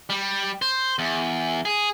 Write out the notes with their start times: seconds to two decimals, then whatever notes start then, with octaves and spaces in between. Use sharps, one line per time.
0.10 G3
0.62 C5
0.99 E2
1.65 G#4